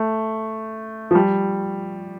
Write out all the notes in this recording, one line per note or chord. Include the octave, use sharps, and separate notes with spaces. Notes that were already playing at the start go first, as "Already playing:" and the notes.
Already playing: A3
F3
G3